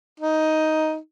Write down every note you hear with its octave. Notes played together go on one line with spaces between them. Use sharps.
D#4